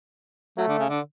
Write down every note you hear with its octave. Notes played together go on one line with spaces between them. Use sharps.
F#3 A3
D3
C#3
D3